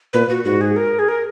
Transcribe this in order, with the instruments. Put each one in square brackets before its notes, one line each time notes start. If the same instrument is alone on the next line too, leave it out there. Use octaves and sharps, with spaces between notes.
[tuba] A#2 [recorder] B4
[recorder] F#4
[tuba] G#2 [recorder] F#4
[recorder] G#4
A#4
G#4
A#4